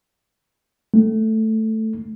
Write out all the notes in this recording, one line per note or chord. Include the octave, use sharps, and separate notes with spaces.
A3